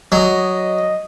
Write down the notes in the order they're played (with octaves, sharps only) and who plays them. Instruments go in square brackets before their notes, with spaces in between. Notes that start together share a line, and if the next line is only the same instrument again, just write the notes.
[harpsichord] F#3 [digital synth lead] D#5